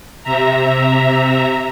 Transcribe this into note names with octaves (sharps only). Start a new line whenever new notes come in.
C3 E5 A#5